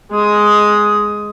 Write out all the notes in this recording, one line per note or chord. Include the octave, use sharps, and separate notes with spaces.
G#3 D#6